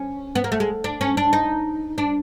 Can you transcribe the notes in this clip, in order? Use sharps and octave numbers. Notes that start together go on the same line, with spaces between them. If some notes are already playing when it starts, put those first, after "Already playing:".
Already playing: C#4
B3
A#3
A3
G#3
D4
C#4
D4
D#4
D4